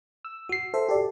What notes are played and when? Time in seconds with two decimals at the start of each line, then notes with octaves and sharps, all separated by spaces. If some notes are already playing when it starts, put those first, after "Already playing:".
0.25 E6
0.49 F#4 C7
0.74 A4 C5 E5
0.88 G4 A4 D5